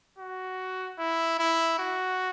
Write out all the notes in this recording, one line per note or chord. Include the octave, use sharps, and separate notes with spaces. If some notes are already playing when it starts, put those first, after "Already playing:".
F#4
E4
E4
F#4